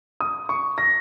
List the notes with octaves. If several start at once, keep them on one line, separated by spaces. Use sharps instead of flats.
D#6
C#6
A#6